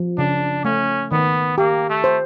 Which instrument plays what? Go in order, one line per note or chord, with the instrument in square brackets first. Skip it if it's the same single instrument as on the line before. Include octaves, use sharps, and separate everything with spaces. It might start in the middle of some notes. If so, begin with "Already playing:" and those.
Already playing: [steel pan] F3
[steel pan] C#3 [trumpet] D4
[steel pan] A3 [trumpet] C#4
[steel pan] D#3 [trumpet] B3
[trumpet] A#3 [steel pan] G4
[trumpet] A3
[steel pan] C5